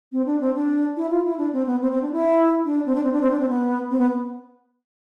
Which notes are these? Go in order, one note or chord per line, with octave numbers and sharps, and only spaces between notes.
C4
D4
C4
D4
E4
F4
E4
D4
C4
B3
C4
C4
D4
E4
D4
C4
D4
C4
D4
C4
D4
C4
B3
C4
B3